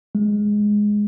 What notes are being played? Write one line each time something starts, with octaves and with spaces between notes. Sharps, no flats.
G#3